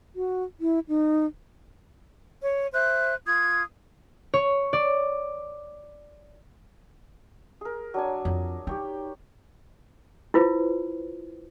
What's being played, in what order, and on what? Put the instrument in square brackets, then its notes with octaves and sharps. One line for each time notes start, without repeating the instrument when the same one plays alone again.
[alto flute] F#4
E4
D#4
[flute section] C#5
C5 E5 F#6
F4 D#6 G#6
[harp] C#5
D5
[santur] G#4 A#4
F#3 D4 G#5
[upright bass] F2
[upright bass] D#4 [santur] G4 C#5 G5
[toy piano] E4 F4 B4 C5